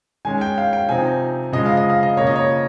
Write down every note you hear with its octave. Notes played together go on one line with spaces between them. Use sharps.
D#3 G#3 C#4 G#5
G5
F5
G5
C3 F3 C4 D#4 G#5
C#3 F3 G#3 D#5
F5
D#5
F5
D#5
C#3 F3 A#3 C#5
D#5
C#5